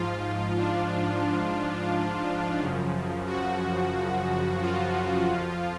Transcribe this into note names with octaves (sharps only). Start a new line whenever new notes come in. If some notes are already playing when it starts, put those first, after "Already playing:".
Already playing: G#2 F3 F4
D4
F#2 C#3 F3
F#4
F4
F2 F3